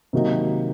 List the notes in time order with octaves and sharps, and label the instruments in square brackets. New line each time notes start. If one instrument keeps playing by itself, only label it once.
[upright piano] C3 D#3 F#3 A#3 D#4